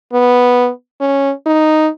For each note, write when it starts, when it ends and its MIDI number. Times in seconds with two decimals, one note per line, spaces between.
0.13 0.70 59
1.01 1.31 61
1.46 1.88 63